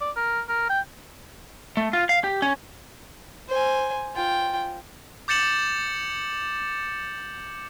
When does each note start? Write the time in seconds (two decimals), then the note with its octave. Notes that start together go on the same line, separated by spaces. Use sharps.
0.01 D5
0.17 A#4
0.49 A#4
0.70 G5
1.77 A3
1.93 F4
2.09 F5
2.24 G4
2.42 C#4
3.49 C5 G#5
4.15 F4 G5
5.28 D6 G6 A6 C#7 E7 F#7